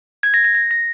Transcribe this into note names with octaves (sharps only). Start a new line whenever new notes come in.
G#6
A#6
A#6
A#6
A#6